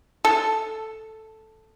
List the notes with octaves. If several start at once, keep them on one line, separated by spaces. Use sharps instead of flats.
A4